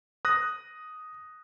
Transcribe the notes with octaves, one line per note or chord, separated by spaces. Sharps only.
D#6 F#6 A#6